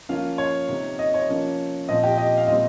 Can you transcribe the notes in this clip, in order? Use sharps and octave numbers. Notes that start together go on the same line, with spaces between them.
F3 A#3 C#4 F4 F5
C#5
C3 D#3 A#3
D#5
C#5
F3 A#3 C#4
A#2 F3 C4 D#5
G4 G5
D#5
F5
A#2 G3 C4 D#5